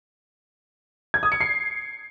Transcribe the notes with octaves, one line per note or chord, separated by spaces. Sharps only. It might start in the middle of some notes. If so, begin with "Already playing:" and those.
G#6
D#6
C#7
C7